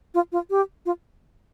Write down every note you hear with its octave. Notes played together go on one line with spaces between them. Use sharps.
F4
F4
G4
F4